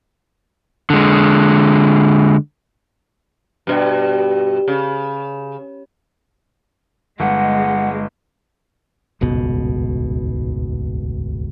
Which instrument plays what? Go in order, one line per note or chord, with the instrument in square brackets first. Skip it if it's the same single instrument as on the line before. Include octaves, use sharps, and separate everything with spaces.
[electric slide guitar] D3 G#3
[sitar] G2 B2
C#3
[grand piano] G1 [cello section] G#3 [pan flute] F#5
[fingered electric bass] D#1 G#1 C#2 B2